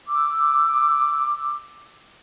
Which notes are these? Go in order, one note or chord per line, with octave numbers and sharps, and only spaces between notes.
D6 E6